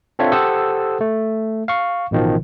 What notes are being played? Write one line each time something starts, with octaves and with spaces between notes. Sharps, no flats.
C4 D4 F4 A4 C#5 E5
G4 A4 C5 F#5 D#6 E6
A3
F5 C#6
A1 B2 D#3 F3